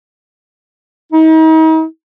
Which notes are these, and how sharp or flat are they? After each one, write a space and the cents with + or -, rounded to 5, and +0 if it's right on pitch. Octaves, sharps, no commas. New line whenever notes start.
D#4 +40